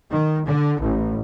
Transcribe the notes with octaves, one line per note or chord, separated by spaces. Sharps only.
D#3
D3
A1